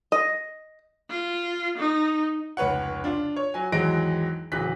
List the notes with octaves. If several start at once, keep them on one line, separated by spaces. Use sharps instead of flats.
D#5
F4
D#4
F1 C#2 B4 C#5 F#5
D4 F4
C#5
F#3 G#5
G#1 E2 F#3 G#3 A#6 D7
D1 C#3 E3 F#3 F#6 B6